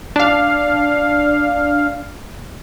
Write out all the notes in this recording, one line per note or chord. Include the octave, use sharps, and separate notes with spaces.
D4 F5